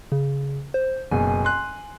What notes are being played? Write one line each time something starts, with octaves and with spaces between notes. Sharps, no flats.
C#3
C5
F#1 B2 G#5
C6 F#6